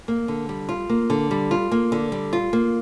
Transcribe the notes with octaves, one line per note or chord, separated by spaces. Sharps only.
A#3
D3
G3
F4
A#3
D3
G3
F4
A#3
D3
G3
F4
A#3